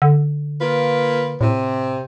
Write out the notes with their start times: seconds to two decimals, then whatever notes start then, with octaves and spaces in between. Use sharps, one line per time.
0.02 D3
0.60 A#3 F4 B4
1.41 A2 C3